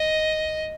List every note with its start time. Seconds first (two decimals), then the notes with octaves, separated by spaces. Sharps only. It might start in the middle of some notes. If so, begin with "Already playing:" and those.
Already playing: D#5